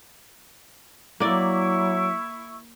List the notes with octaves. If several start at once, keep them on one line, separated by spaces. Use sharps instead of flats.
F#3 A#3 E4 D5 C#6